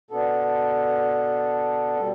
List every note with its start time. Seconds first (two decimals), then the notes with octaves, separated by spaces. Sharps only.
0.11 B2 B3 D4 A4
1.98 B2 G3